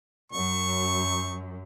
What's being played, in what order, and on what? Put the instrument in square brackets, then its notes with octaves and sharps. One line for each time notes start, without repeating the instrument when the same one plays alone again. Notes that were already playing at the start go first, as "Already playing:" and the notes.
[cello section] F#2 [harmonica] C#6